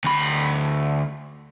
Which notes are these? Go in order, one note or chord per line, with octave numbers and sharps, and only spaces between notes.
D2 B5